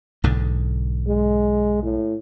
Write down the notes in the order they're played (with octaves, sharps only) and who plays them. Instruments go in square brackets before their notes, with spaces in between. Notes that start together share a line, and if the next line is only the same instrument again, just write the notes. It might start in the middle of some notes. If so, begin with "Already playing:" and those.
[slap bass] B1 G#2 D3
[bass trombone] G#3
A2